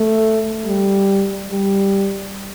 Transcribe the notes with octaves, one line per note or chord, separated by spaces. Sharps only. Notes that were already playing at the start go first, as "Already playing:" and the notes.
Already playing: A3
G3
G3